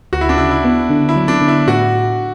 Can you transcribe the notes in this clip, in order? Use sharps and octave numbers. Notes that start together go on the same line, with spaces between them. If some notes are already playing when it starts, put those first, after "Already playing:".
D2 F#4
E4
D4
C#3 E4
E4
B3
D3
E4
F#3
D4
D3
E4
A2 F#4